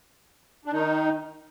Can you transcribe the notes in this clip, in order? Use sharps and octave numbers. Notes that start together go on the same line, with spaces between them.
D4
D#3 D#4